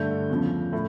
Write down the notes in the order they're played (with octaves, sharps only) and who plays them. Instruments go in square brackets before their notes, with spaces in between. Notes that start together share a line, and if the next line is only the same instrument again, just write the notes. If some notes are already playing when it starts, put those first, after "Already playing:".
Already playing: [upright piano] G2 D3 A3 G6
E2 C#3 F3
A2